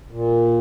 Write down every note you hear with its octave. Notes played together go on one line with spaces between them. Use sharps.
A#2